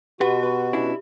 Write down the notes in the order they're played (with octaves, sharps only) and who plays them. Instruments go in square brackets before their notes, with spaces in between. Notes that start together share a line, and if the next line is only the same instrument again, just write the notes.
[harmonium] B2 F#4 [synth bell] G4 [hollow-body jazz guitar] B4 F#5
[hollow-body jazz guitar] B4
C#4 D4 E4